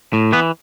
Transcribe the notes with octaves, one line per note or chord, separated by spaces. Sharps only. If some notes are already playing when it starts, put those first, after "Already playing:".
A2
E3 B3